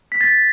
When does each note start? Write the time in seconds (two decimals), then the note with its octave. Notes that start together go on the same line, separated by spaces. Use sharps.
0.12 B6
0.21 A6